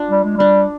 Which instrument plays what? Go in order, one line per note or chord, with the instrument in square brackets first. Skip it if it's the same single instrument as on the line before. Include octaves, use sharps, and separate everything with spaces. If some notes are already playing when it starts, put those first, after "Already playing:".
Already playing: [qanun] D4 F4
[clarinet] G3
G#3
[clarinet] G3 [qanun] D4